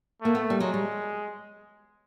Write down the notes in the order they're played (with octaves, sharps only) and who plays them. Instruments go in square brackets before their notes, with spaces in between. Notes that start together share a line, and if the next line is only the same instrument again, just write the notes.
[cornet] A3 [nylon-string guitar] A#3
[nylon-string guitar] B3
G3
[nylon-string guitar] F#3 [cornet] G#3
[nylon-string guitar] G3